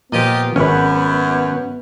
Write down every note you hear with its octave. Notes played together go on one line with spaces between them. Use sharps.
A#2 F3 B3 F4 G4 D#5
G#1 F#2 C#4 B4